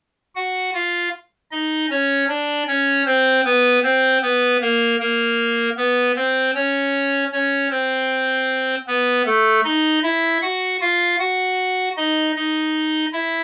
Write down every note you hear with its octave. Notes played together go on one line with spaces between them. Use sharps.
F#4 F#5
F4 F5
D#4 D#5
C#4 C#5
D4 D5
C#4 C#5
C4 C5
B3 B4
C4 C5
B3 B4
A#3 A#4
A#3 A#4
B3 B4
C4 C5
C#4 C#5
C#4 C#5
C4 C5
B3 B4
A3 A4
D#4 D#5
E4 E5
F#4 F#5
F4 F5
F#4 F#5
D#4 D#5
D#4 D#5
E4 E5